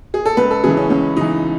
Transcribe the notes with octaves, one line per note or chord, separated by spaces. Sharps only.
G#4
A4
C#2 B4
A4
C#3 E3 G#4
C#4
C#2 C#4
C#3 E3 D#4